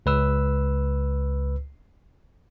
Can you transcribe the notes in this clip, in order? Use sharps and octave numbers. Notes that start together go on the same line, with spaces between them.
C#2 B4 E6